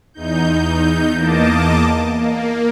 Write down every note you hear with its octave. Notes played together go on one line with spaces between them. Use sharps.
E2 D#4 G6
E2 A#3 D#5 A5 D6
A#3